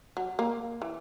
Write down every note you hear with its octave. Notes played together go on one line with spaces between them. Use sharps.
F#3
A#3
E3